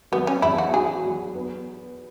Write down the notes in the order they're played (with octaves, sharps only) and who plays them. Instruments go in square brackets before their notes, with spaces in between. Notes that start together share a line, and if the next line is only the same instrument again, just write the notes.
[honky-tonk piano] F#3 [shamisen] B3
[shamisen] C#4
[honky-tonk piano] E2 [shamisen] E4
[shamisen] F#4
[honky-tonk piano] F#4 [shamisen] G#4
[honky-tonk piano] F#3
B3